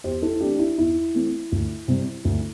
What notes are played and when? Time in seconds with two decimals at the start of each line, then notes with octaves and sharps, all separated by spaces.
0.04 E2 G4 C5
0.22 E4 A4
0.33 E4
0.41 E3 A3 C4 D4 G4
0.56 G4
0.59 E4
0.78 E2 E4
1.14 E3 A3 C4
1.52 D2
1.88 C3 G3 C4
2.25 D2